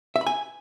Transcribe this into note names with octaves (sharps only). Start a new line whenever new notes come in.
E5
B5
G#5